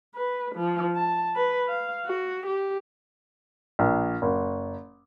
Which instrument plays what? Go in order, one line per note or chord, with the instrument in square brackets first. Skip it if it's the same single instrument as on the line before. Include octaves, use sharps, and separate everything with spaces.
[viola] B4
F3
A5
B4
F5
F#4
G4
[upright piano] A#1
F#1